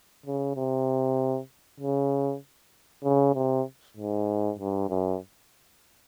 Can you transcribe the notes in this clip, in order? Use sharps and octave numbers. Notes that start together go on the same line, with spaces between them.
C#3
C3
C#3
C#3
C3
G#2
G2
F#2